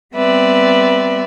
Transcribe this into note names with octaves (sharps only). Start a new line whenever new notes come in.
G3 B3 C4 B4 D5 E5